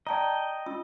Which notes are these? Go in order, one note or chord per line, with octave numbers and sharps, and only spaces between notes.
D5 D#5 G5 A5 A#5
C#4 F4 E6